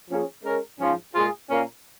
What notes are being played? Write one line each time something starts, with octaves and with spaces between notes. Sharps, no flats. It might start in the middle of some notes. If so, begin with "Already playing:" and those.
F3 A#3 C#4 G#4
G#3 C#4 A#4
G#2 F3 C#4 F4
A#2 G#3 F4 G#4
A#2 A#3 C#4 A#4